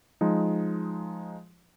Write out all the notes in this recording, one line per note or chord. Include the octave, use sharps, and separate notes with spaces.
F3 G#3 D#4